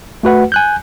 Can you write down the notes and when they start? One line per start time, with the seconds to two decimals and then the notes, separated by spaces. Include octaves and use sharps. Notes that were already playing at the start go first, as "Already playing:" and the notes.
0.23 A3 F#4 B4 F#5
0.52 G#5 F#6 G6